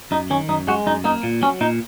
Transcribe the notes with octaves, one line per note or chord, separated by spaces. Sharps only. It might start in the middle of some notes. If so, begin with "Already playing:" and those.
F#2 D#4
D#3 C#4
F#2 D#4
G#3 F#4
F#2 D#4
A#3 D#4
A#2
F#3 C#4
A#2 D#4